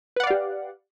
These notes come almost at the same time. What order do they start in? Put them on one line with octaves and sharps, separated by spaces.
B4 F#5 D5 F5 G4